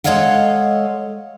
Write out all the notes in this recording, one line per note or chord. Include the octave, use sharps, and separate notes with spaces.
G#3 A4 C#5 D#5 F5 F#5